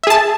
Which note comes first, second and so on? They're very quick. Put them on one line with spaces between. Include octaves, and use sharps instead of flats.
E5 G#4 A5